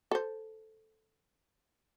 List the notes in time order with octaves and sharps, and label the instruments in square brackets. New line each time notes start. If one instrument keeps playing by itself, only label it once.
[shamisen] A4 C5